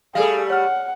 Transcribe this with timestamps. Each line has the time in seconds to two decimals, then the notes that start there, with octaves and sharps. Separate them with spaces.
0.15 G3 A3 G#4 A4 F5
0.50 C#5 F#5 F6